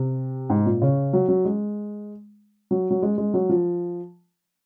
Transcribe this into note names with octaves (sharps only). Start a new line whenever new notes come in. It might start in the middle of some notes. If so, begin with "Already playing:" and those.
Already playing: C3
G#2
A#2
C#3
F#3
F#3
G#3
F#3
F#3
G#3
G#3
F#3
F3